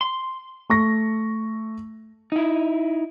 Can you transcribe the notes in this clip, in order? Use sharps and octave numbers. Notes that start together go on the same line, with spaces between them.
C6
A3 C#6 A#6
D#4 E4